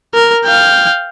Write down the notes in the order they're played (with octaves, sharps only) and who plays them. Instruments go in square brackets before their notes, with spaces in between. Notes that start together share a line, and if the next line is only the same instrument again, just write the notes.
[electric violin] A#4
F5 G5